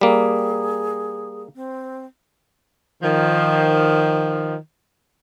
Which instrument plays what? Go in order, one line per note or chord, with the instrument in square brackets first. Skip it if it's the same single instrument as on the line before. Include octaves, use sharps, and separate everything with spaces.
[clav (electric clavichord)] G3 A#3 [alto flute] G#4
[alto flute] C4
[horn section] D#3 F3